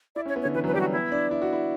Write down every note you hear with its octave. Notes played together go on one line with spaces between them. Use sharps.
E4 D5
C#4 C#5
B3
C#5
D3
E3 B4
F#3
B4
G3 G4
F#4
B3 E4
D4
E4
F#4
E4